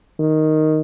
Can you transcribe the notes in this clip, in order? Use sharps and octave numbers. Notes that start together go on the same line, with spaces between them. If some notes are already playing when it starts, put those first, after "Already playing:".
D#3